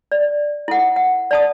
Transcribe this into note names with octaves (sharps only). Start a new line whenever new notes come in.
D5
E4 A4 F#5
F#5
D5 A5 D#6